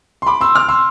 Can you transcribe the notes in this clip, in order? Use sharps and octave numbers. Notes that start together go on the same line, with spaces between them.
C6
B5 D6
C6 E6
D6 F6
C6 E6